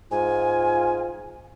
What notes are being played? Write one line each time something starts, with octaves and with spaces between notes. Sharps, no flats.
G#2 F4 G#5